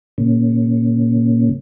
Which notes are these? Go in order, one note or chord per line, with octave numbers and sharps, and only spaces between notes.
A#2 C#3